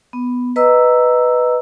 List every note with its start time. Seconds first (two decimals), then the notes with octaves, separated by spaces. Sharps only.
0.13 B3
0.56 B4 D#5 A#5 E6